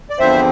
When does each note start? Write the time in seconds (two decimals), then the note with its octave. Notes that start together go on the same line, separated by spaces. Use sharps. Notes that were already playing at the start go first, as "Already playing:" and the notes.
0.10 D5
0.19 E2 D3 F3 C4 C5 E5